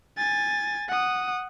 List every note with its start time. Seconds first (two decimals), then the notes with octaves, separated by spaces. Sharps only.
0.17 G#5 A6
0.89 F#5 D#6